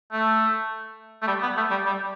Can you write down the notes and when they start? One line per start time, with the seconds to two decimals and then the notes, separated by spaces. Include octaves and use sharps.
0.12 A3
1.22 A3
1.27 G3
1.42 B3
1.57 A3
1.71 G3
1.85 G3